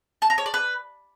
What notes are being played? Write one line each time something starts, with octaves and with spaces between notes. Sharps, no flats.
A5
A#5
C#5
D5
B4